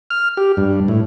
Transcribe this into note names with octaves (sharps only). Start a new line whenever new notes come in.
F6
G4
G2
A2